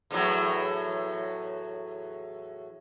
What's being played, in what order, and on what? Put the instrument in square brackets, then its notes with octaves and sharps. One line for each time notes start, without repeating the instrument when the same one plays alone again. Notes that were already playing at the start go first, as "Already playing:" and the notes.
[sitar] E2 A2 F#3